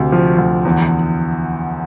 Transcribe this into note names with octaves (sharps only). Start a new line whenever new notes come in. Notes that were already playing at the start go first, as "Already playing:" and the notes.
Already playing: D2 C3
F3
D2
E2